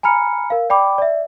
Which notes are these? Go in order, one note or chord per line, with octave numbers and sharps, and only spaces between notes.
G#5 A#5 B5 F6 C#7
A#4 F5
D5 G5 B5 D6
D5 E5